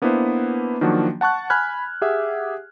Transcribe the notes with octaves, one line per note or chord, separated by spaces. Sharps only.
A#3 B3 D4 E4 B4 C5
D#3 F3 F#3 A#3 D4 F#4
F#5 A5 C#6 F#6
G#5 B5 F6 F#6 G#6
G4 G#4 E5 F#5